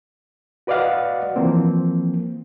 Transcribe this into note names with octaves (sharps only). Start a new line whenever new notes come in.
F#4 B4 D5 D#5 F5 F#5
E3 F3 A#3 C4